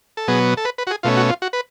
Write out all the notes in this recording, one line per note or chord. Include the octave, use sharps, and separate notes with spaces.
A4
B2 F#3 B3 G#4
A4
B4
B4
F#4
G#4
B2 A3 C#4 F4
F#4
F4
F#4
B4